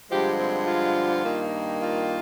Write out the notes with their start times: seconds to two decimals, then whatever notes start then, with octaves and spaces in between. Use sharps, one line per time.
0.10 G2 D3 F3 G#3 G4
0.39 C4
0.68 F4
1.24 G2 D#3 A#3
1.81 F4